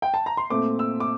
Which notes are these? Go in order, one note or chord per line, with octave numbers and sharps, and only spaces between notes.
G5
A5
A#5
C6
A#2 A3 C4 D6
E6
D6